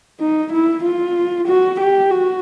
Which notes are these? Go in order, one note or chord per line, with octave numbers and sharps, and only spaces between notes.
D#4
E4
F4
F#4
G4
F#4